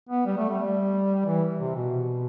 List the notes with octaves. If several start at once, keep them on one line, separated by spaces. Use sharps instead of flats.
B3
G3
A3
G3
E3
C3
B2